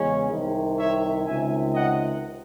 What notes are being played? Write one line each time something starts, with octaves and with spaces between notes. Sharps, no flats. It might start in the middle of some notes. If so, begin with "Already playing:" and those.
Already playing: E2 C#3 G#3 C#4
C2 C3 D#3
C#5 E5
C#2 C3 D#3 E5 G#5
D#5 F#5